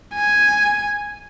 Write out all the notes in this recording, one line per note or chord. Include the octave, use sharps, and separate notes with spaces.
G#5